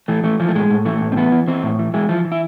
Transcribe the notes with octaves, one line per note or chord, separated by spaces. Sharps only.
E3 A3
E3 A3
E3 F3
A3
A2 G#3
A2
E3 A3
A2
C4
E3 B3
E3
E3 C4
A2
E3
E3 G#3
E3 F3
E3
E4